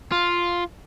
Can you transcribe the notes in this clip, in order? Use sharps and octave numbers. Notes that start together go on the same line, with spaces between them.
F4